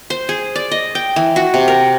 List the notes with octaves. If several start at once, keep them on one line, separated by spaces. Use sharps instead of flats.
C5
G#4
D5
D#5
G5
E3
F#4
C3
A#4